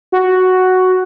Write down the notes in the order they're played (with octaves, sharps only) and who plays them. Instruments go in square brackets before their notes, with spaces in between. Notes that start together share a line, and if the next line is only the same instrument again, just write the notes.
[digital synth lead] F#4